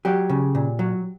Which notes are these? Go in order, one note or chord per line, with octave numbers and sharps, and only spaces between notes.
F#3 G4
C#3
A#2
F#3